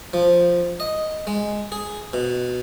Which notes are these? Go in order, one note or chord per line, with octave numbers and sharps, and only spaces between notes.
F3
D#5
G#3
G#4
B2